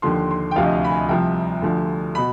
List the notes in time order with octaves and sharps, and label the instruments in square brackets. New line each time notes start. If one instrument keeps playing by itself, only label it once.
[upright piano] D#2 D3 F3 C6
C6
G5
D2 C3 F3 F5
D#5
F5
B5
G#5
C2 C3 F3 G5
D2 D3 F3
B2 B5